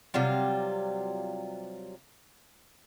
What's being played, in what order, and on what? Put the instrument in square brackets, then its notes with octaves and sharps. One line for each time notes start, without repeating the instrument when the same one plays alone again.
[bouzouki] C3 F#3 G3 F4